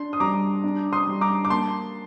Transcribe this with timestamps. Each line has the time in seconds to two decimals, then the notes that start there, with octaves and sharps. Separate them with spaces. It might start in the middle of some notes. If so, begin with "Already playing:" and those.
Already playing: D4 C6
0.13 D#6
0.20 G3 A#5 D6
0.64 D4
0.93 C6 D#6
1.07 G3
1.21 A#5 D6
1.45 D6
1.50 A#3 A5 C6